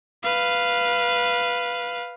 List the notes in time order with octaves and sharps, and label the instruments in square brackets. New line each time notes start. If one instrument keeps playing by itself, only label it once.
[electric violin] B4 F5